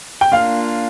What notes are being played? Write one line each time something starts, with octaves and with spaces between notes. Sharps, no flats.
G5
A#3 D4 F4 F5